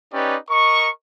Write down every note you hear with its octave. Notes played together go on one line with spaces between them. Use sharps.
C#4 D#4 G4 B4 D5
A#4 D#5 C#6